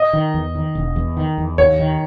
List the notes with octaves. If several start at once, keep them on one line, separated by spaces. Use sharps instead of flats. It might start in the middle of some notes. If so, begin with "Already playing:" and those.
Already playing: D#5
D#3
E2
D#3
E1
E2
D#3
E2
D#2 C#5
D#3